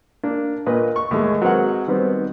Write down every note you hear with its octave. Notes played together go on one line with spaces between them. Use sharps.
A#3 D4
A#2 A#3 B4 D#5
C#6
D#2 A2 G#3
F#3 G#3 C4 A#4 B4 F#5
D#3 G3 B3 C4 F#4